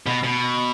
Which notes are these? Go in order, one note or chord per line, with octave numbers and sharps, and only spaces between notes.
B2
B2